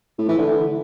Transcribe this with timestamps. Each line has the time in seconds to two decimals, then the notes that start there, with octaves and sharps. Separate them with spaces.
0.18 A2
0.28 E3
0.38 D3